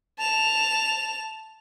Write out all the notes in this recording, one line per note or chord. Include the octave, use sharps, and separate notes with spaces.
A5 F7